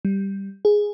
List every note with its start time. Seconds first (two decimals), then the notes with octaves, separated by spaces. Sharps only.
0.05 G3
0.65 G#4